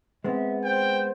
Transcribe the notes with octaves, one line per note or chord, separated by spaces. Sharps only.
G#3 B3 C4 E5
C5 G5